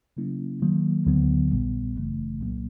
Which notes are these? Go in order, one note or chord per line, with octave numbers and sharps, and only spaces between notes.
C#3 F#3 A#3 C#4 E4
D#3 F#3 A#3
D2 D3 F#3 B3
A#1 A#2 G3 B3
G1 F#2 C#3 E3 A3
C2 A#2 F#3 A#3